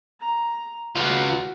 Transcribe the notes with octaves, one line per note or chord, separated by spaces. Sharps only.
A#5
C#2 F4 F#4 F5